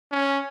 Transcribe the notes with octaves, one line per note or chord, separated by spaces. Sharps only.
C#4